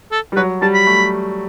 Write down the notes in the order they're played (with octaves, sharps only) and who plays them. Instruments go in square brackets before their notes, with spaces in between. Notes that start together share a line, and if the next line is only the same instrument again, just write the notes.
[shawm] A4
[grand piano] G3
[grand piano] F#3 [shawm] B4
[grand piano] G3 [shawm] A5
[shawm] B5
[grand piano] A3